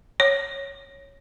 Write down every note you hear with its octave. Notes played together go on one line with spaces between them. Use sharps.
C#5